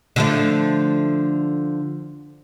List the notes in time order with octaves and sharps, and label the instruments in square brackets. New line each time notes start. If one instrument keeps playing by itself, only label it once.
[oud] D3 F3 A3